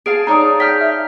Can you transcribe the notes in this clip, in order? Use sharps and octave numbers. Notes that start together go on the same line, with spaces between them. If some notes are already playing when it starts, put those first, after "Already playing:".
G#4 F5 A5 D7
D#4 C#5 D5 A#5 D#6
G5 F6 G6 B6
E5